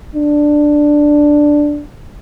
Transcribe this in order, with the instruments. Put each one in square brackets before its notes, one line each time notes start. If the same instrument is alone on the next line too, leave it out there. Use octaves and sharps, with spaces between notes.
[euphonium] D4